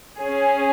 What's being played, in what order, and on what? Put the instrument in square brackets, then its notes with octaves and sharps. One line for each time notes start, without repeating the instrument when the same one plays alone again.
[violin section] C#4 G#4